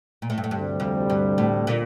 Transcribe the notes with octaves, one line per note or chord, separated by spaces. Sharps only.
A#2
A2
G2
A2
D2 G2 C3 G3
F2
G2
A2
A#2